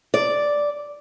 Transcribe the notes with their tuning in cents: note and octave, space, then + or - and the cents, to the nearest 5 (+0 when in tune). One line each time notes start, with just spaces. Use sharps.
D5 -5